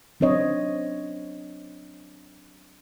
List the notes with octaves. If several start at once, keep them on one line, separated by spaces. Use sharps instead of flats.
F#3 C4 D4 C#5 D#5